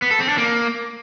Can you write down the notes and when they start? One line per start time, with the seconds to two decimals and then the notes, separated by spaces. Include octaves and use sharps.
0.02 B3
0.11 A4
0.20 C4
0.29 D4
0.38 A#3